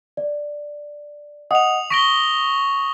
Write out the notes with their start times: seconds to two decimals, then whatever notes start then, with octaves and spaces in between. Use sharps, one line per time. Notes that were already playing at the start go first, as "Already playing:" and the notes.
0.17 D5
1.51 D#5 F#5 D#6 F7
1.90 C#6 A#6 B6 D7 G7